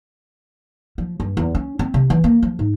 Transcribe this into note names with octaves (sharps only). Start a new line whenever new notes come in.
F3
G2
E2
C#4
C4
C3
E3
A#3
F3
G#2